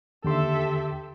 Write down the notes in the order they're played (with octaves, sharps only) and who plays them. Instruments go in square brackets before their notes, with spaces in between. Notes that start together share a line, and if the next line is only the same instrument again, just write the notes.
[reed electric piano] D#2 D3 C6 [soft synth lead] G4 [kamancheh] A4 E5